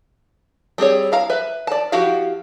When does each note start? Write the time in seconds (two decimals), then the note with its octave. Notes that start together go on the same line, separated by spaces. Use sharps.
0.78 G3 C4 G#4 C#5
1.12 E4 F5 A#5
1.30 B4 E5
1.67 D5 A5
1.92 F3 E4 F#4 G4 F5